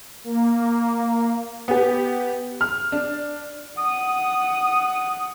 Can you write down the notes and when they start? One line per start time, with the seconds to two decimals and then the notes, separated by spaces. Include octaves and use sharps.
0.24 A#3
1.68 B3 G4
2.61 F6
2.92 D4
3.78 F#5 D#6